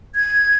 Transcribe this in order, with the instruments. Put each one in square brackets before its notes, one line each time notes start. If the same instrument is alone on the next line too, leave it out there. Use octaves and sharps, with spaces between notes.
[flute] G#6